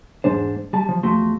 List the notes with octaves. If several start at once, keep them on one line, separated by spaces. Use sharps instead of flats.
E2 G#2 G#3 D4 C5
G3 A5
F3
E2 F3 A3 F#4 C6